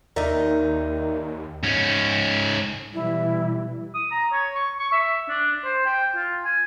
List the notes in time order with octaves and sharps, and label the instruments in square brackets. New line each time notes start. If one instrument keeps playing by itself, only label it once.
[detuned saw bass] D#2 [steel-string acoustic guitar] D#3 D#4 [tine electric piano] A#4 D5 E5
[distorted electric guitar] G#2 C#4
[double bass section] B2 E3 G3 [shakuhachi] E4
[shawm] D#6
A#5
C#5
C#6
C#6
E5
D4
C5
G5
F4
G#5